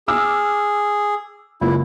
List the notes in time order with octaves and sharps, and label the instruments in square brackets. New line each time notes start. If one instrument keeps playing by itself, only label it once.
[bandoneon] G#4 [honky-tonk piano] D6 E6 F6
[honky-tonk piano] F#1 C#2 [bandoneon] E4